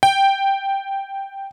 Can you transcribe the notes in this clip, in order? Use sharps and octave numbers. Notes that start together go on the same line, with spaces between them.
G5